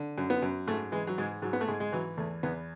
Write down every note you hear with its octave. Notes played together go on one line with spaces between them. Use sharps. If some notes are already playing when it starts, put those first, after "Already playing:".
Already playing: D3
F#2
B3
F#2
G#2 A3
E3 G#3
F#3
G#2 G#3
G#2 F#3
B3
A3
G#2 G#3
G#3
E3 F#3
E2 A3
E2 B3